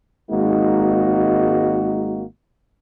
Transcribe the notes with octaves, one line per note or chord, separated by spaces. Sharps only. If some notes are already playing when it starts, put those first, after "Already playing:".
G#1 G#3 A#3 D#4 F#4